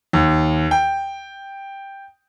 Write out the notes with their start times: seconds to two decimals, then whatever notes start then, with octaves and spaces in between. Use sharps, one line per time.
0.13 D#2
0.71 G5